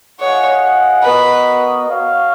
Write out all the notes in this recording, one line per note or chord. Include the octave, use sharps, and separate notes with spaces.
F4 G#4 C#5 D#5 F#5
B3 F#4 A#4 B4 D#5
F#4 C#5 F5